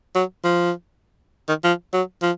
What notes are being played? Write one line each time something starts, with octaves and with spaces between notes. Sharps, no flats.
F#3
F3
D#3
F3
F#3
F3